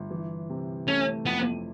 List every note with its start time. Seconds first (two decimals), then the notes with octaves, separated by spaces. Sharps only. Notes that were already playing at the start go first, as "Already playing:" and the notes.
Already playing: G1
0.11 E3
0.50 C3
0.88 A3 C#4
1.26 F2 B3